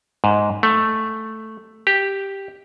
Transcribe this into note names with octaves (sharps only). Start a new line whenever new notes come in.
G#2
A3
G4